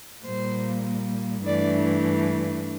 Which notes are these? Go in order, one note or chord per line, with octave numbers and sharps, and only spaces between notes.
A#2 G3 A#3 C5
G2 E3 A3 D4 D5